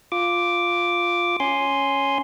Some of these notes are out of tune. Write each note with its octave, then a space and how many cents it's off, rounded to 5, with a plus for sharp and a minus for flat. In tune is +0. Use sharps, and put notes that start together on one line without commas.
F4 +0 D6 +0
C#4 +0 G#5 +0 C6 +0